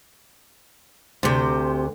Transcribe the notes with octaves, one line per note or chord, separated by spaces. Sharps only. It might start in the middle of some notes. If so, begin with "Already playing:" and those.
D2 C3 C5